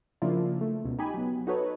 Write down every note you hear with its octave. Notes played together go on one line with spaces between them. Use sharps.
C#3 F3 A#3 D4 E4 F4
A3
C#2 B2
D#4 G4 G#5 B5
F#3 B3
D#4 F#4 A4 B4 C#5